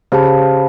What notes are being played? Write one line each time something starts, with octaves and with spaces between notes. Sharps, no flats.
C#3 G4 C5 F5 A5